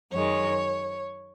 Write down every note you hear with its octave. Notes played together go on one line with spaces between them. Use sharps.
F#2 D#3 G#3 C#5